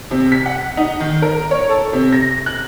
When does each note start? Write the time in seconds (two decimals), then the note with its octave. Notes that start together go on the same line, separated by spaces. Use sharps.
0.11 C3
0.32 B6
0.46 F#5
0.77 D#4
1.00 D#3
1.22 A#4
1.51 C#5
1.69 A4
1.93 C3
2.13 A#6
2.46 F#6